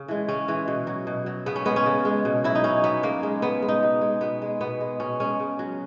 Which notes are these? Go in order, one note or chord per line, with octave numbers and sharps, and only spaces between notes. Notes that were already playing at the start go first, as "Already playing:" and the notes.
Already playing: C#3
E3 G#3
C#3 C#4
E3 G#3
B2
F#3
B2
F#3
C#3 B3
C#4
G#3 B3
C#4
C#3
G#3
B2
F#3 E4
D#4
B2 C#4
F#3 B3
C#3 A#3
G#3
C#3 B3
G#3
D#4
B2
G#3
B2 B3
G#3
B2 B3
G#3
B2 C#4
G#3 C#4
C#3
F#3